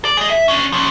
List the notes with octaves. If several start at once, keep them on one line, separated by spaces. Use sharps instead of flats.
D5
G#4 D#5
E5
C#4 D4
F3 C#4